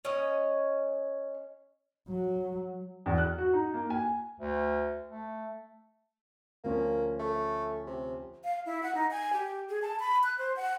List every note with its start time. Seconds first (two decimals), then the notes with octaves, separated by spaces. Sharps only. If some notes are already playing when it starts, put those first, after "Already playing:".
0.05 C#4 D#5
2.08 F#3
3.06 E2
3.18 F#6
3.38 F#4
3.53 D#4
3.74 A#3
3.90 G#5
4.40 D2
5.09 A3
6.64 D2 F3 A#3 C#4
7.19 A3
7.86 C3
8.44 F5
8.66 E4
8.83 F#5
8.95 D#4
9.11 G#5
9.33 G4
9.70 G#4
9.82 A5
10.00 B5
10.24 F#6
10.38 C5
10.56 F#5